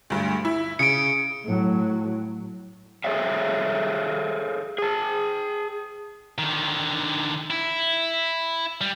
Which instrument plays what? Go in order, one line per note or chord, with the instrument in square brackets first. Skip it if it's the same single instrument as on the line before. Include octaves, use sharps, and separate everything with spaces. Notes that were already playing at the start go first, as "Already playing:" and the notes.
[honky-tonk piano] D2 G2
E4
[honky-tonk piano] C#3 [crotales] C#7 D7
[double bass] A2 F#3
[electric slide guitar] G#4 A4 C#5 E5 F5
G#4 A5
[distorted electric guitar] D3 D#3
E4
G3